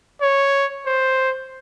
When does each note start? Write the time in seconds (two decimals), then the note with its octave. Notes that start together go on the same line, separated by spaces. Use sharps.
0.21 C#5
0.86 C5